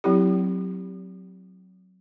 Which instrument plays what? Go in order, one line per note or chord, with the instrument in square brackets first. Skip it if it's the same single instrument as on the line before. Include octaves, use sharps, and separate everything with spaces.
[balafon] F#3 C4 E4 G4